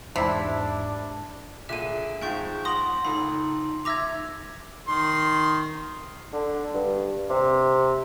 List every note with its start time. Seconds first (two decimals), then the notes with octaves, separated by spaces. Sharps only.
0.16 E2 G#2 C3 D4 E4
1.69 A#2 D3 G#4 E5 D#7 E7
2.21 F2 G#2 G5 C#6 G6
2.65 F#5 C6 D#6 A#6 F#7
3.05 C#2 D#4 A4 B5
3.85 E5 D6 E6 G#6 A#6 F7
4.88 D#3 C6
6.33 D3
6.74 G2
7.30 C3